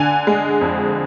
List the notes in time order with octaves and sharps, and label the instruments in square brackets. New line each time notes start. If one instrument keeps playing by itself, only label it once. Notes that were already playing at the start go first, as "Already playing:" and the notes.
Already playing: [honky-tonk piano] D3 G#5
G#3
F2